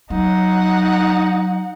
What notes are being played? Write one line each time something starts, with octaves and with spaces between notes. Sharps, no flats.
F#3 D#4 F#5